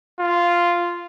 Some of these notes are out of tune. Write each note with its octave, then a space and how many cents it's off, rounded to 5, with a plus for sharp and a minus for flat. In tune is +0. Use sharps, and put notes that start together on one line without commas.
F4 -5